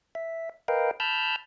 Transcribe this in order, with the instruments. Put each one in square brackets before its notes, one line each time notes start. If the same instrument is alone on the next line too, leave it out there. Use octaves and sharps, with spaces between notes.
[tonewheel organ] E5
A#4 B4 D#5 F5 G5
A5 B5 E6 F6 G6